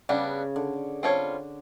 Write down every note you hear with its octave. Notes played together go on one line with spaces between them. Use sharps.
C#3 G3 B3 D4
D3
G3 C4 F4 A4 C#5